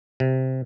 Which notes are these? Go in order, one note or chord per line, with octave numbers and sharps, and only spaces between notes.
C3